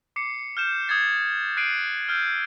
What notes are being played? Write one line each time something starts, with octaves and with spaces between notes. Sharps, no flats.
D6 C7 C#7
F6 G6 E7
D#6 G#6 A6 C7
F#6 A6 C7 D7 D#7 F#7
E6 F6 G6